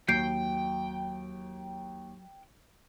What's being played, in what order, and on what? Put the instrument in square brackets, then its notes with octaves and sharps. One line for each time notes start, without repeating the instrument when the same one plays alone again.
[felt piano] D#2 [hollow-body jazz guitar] F#3 [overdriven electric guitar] G5 [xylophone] G6 C7 D7